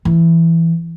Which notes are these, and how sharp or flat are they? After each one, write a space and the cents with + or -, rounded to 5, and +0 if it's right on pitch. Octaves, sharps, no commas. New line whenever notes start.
E3 +10